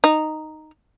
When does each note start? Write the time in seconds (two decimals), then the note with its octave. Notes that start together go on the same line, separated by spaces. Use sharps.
0.04 D#4